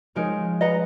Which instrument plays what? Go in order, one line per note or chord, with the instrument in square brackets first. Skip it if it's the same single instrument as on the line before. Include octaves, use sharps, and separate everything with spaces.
[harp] F3 G#3 [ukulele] D#4 A#4 C#5 G#5
[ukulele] B4 D#5 F#5 A#5